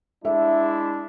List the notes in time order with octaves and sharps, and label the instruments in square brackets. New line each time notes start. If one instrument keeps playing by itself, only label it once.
[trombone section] G#3 D4 E4 [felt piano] E5